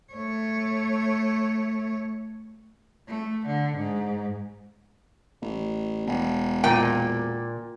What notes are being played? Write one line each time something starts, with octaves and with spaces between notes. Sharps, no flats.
A3 C#5
A3
D3
G#2
A1
E1
A#2 G5